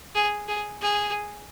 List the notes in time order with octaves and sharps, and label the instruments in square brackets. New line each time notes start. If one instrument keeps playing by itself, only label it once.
[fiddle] G#4
G#4
G#4